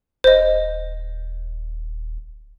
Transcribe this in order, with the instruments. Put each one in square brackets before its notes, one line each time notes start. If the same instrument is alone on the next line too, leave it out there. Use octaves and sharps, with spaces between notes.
[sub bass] D#1 [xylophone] C5 D#5